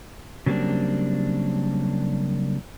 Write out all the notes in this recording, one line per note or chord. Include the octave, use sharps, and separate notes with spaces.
C#3 F#3 G3 A#3 C4 D4